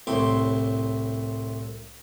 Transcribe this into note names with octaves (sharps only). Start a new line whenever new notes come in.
C2 A2 C4 C#5 C6 D6